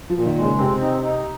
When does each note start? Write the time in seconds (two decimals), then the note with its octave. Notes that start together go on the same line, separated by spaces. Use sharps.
0.10 F3
0.15 A#2
0.26 D#3
0.37 G#3
0.43 C#3
0.59 C3 C4
0.81 D#4
1.04 D#4